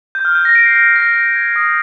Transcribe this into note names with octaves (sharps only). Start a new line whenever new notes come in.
G6
F6
G6
A#6
A#6 D7
C7
A#6 D7
C7
A#6
A#6
G#6
D#6